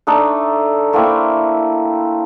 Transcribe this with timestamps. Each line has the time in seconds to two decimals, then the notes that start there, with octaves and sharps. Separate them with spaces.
0.07 A3 D4 D#4 A4
0.93 A3 A#3 C4 E4